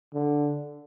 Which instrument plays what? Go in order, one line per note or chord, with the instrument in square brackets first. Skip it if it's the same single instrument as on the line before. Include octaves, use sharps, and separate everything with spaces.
[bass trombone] D3